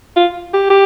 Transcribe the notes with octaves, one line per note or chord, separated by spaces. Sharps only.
F4
G4
G4